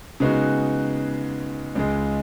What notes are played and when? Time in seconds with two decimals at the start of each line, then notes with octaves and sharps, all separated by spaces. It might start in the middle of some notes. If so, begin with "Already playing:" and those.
0.20 C#3 G#3 B3 D#4 F#4
1.75 C#2 C#3 G#3